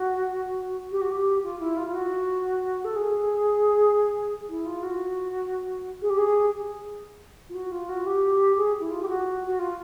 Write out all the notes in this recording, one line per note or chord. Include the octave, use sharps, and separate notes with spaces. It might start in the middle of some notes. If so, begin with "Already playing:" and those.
Already playing: F#4
G4
F#4
G4
F4
E4
F4
F4
F#4
A4
G#4
E4
F4
F#4
G#4
G4
G#4
F4
F#4
F4
F#4
G4
G#4
E4
F4
G4
F#4
F#4
F4